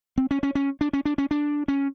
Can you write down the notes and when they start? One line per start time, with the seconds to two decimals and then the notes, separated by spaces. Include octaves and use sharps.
0.18 C4
0.31 C#4
0.43 C#4
0.55 C#4
0.81 D4
0.93 C#4
1.05 D4
1.18 C#4
1.31 D4
1.68 C#4